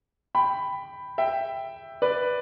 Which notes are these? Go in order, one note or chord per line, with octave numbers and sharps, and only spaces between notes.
G5 B5
E5 G5
B4 D5